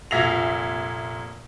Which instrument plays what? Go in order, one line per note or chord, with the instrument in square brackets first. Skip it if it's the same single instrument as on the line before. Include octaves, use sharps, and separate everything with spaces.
[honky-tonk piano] F1 A#2 E5 A#6 C7 F7